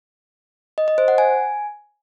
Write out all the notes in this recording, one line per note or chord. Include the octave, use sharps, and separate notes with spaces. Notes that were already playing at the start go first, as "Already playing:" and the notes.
D#5
D#5
C5
F#5
G#5